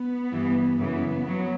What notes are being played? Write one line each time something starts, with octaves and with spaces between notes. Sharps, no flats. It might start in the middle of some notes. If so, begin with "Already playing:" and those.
Already playing: B3
G2 E3
F#2 C#3 E3 B3
F#3